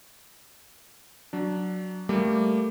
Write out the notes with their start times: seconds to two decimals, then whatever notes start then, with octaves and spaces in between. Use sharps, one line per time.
1.33 F#3 D4
2.09 G3 A3 A#3 D6